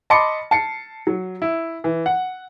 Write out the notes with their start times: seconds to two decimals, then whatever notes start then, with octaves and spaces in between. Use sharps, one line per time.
0.10 D#5 A5 B5 C6 D6 C#7
0.51 A5 C7 C#7
1.07 F#3
1.42 E4
1.84 E3
2.06 F#5